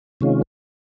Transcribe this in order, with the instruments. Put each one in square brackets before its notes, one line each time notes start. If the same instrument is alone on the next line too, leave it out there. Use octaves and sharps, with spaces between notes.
[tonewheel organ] C3 D#3 G#3 C#4 F4